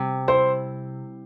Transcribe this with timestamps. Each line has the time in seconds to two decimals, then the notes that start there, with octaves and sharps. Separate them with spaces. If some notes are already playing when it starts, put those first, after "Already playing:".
Already playing: C3 G3
0.28 E4 C5